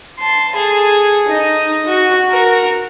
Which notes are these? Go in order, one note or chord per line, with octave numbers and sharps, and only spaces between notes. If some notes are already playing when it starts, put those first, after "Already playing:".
A5 C6
G#4 A4
D#4 D#5
F#4
F#4 A#4